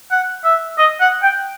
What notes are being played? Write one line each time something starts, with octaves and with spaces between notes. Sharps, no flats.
F#5
E5
D#5
F#5
G5